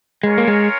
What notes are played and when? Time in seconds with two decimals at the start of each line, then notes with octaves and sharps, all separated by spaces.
0.23 G#3 C#4 F4 A#4 C#5
0.38 A#3
0.48 G#3